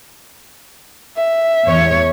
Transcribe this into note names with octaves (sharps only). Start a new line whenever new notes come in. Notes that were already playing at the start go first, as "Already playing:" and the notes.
E5
E2 C#5